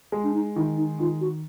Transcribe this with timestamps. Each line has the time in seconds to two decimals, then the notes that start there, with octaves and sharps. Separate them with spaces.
0.12 G#3
0.24 D4
0.34 D#4
0.56 D#3 E4
0.77 D#4
0.99 D#3 F4
1.21 F#4